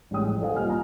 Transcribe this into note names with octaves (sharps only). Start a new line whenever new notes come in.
A1 G3 G#3 C#5 G5 D#6
F3
A4 C5 D#5 F5 F#5 G#5
C2 A#3 F4 G4 G#5 F6
G#5 A#5